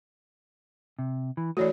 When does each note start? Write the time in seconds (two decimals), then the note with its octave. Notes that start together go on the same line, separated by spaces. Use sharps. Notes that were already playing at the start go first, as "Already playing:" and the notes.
0.99 C3
1.37 E3
1.57 E3 A3 F#4 C#5 D5